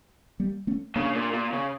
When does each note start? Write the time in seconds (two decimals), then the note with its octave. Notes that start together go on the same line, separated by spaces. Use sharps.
0.40 G3 A#3
0.67 A3 C#4
0.96 C#3 A#3 D4
1.15 A#2
1.34 A#2
1.53 C#3